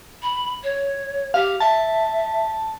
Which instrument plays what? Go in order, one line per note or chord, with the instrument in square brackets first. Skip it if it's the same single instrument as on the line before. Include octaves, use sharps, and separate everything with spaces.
[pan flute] B5
C#5
[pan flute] G4 [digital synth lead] F5
[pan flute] E5 [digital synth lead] A5